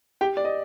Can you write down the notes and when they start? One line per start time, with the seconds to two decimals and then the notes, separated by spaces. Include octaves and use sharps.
0.21 G4 G5
0.37 D5
0.45 D#5